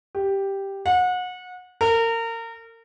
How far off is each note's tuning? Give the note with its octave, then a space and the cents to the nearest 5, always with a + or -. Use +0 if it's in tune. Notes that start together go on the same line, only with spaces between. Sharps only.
G4 +0
F#5 -30
A#4 -30